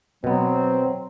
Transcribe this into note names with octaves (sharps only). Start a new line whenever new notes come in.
B2 F#3 B3 C4